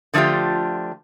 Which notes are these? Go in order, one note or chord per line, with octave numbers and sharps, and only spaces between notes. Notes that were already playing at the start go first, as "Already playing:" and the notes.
D3 F3 A3 D4 F4 G4